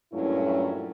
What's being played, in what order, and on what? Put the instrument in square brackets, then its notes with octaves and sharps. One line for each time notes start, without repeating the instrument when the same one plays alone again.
[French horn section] G2 A#2 F#3 A3 C#4 E4